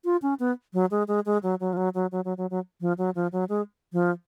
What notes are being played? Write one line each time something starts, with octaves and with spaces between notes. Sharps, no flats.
F4
C#4
B3
F#3
G#3
G#3
G#3
F#3
F#3
F3
F#3
F#3
F#3
F#3
F#3
F#3
F3
F#3
F3
F#3
G#3
F3